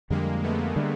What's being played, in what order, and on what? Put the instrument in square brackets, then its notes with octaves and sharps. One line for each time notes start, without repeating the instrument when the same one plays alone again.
[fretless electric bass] F2 D3 G3 [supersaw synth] G#3 A#3
[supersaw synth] A3 B3
[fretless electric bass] D3 G3